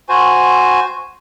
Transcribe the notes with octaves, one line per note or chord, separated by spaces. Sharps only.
F#4 C5 G#5